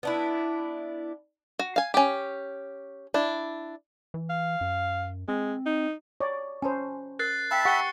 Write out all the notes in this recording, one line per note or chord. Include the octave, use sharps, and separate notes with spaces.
B3 D4 E4
F#4
F5 G#5
C#4 G4
D4 E4
E3
F5
F#2
G#3 C4
D#4
C#5 D5
C#4 C5 G#5 A5 B5
A#4 F#6 A6 C7
E5 F5 G5 A5 B5
G4 F#5 G5 C#6 C#7 G7